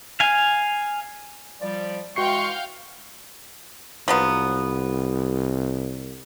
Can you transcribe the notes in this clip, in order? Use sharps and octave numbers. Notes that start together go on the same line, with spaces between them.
F5 G#5
F3 G3 D5
E3 G#3 F#4 F5 G5 C6 C#6 C7
C2 F3 F#3 B3